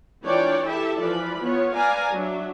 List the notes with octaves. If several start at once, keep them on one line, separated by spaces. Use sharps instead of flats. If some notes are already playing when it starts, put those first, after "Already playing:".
E3 D4 F4 C#5 D5 G5
E4 G4 A4 E5
E3 F3 F4 D5 B5
B3 F4 C#5
B4 D5 F5 G#5 A#5
F#3 D4 E5